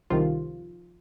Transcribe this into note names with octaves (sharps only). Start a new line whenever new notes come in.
C2 C3 D#3 F3 F4